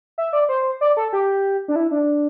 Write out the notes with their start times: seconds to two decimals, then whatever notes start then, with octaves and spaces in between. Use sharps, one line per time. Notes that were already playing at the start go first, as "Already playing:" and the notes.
0.18 E5
0.33 D5
0.49 C5
0.81 D5
0.97 A4
1.13 G4
1.68 D4
1.76 E4
1.91 D4